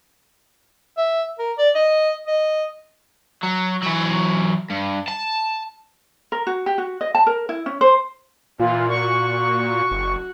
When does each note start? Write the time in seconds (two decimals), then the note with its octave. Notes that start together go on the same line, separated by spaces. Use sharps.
0.98 E5
1.39 A#4
1.58 D5
1.75 D#5
2.27 D#5
3.43 F#3
3.83 E3 F#3
4.70 G2
5.08 A5
6.32 A#4
6.47 F#4
6.66 G4
6.78 F#4
7.01 D#5
7.15 A5
7.27 A#4
7.49 E4
7.66 C#4
7.81 C5
8.59 A#2 E3 F4
8.90 F#4 C#6
9.91 F#1